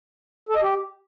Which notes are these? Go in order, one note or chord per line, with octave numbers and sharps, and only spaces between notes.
A4
D#5
G4